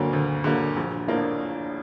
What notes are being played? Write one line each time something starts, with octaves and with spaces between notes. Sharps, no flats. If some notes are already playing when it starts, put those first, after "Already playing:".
Already playing: D2 D3 F#3 A#3
D2
D3 F#3 A#3
A#1
A2 F3 A#3 D4